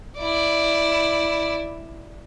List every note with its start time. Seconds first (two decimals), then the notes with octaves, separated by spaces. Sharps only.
0.19 E4 D5